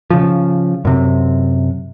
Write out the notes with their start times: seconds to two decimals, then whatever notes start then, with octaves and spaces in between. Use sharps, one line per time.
0.11 C#3 F3
0.85 F#2 C3